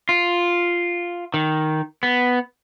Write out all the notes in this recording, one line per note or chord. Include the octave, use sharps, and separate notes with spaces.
F4
D#3
B3